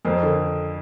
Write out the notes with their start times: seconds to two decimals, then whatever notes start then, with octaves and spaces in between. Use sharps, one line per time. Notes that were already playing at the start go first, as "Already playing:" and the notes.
0.05 F2 A#4 C5
0.23 D3